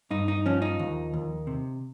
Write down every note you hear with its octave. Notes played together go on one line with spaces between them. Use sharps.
G2 D#4
D#4
F3 C#4
D#4
D#2
D#2
C3